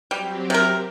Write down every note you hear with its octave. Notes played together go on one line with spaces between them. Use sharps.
F#3 G3 C4 G4
C3 A#4